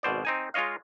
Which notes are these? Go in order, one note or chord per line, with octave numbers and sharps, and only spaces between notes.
G#1 B2 C5 D5
C4 D#4 G#5
G#3 F4 C#5 D#5 F5